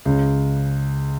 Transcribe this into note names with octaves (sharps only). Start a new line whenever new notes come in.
C#2 C#3